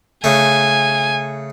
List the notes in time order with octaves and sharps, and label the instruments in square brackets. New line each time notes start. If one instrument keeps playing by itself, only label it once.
[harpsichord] C#3 A3 [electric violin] G#5